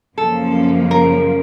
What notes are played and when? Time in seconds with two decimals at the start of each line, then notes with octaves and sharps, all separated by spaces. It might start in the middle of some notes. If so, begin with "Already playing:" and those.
0.16 F#2 C#3 F3 A#3 C#4 A4
0.91 A#4